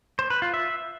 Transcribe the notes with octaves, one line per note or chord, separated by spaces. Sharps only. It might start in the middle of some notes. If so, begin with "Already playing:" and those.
C5
B4
F4
E5